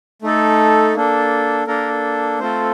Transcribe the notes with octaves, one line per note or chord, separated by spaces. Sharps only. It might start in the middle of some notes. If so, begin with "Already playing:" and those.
A3 D#4 A4
A#3 D4 A4
A#3 D4 A4 A#4
A3 C4 F4 A4 C5